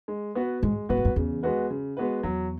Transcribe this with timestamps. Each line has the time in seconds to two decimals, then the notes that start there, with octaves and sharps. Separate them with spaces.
0.08 G#3
0.35 B3 F#4 B4
0.63 G#2 G#3
0.89 F#2 B3 F#4 B4
0.97 G#2
1.05 F#2
1.16 E2 C#3
1.43 G#3 B3 F#4 B4
1.70 C#3
1.97 G#3 B3 F#4 B4
2.23 E2 F#3